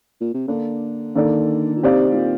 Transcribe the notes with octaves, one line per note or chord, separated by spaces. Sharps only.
A#2
C3
D3 A#3 D4 A4
D#3 A#3 D4 A4 D5
A#2
C3 C4 D#4 G4 D5 F5
A2
A#2